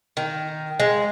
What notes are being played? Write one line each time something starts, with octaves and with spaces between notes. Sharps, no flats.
D#3
G#3